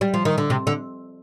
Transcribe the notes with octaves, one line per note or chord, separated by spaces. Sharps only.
G3
F3
D#3
D3
C3
D3